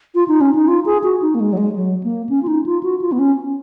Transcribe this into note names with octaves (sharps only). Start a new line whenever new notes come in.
F4
D#4
C#4
D#4
F4
G#4
F#4
D#4
A#3
G#3
F#3
G#3
F#3
A#3
C#4
F4
D#4
F4
F#4
F4
B3
C#4